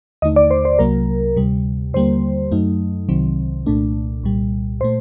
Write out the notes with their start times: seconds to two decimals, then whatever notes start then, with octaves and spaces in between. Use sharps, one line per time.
0.22 D#2 D3 A3 D#4 D#5
0.36 D5
0.51 C5
0.65 C5
0.79 C2 C3 F#3 A#3 A#4
1.36 D2 C3 G3
1.93 D#2 D3 G3 A#3 C5
2.51 F#2 F#3 A3 D#4
3.09 C2 C3 D#3 F#3 C4
3.66 C2 A#2 A3 D4
4.23 C2 A#2 G3
4.81 A#2 A3 C5